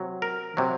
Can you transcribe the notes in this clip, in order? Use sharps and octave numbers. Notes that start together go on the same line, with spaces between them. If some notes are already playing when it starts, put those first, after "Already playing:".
Already playing: C3 F#3
A#4
C3 F#3